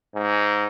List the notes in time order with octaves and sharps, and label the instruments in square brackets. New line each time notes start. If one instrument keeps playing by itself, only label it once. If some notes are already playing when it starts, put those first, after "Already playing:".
[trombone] G#2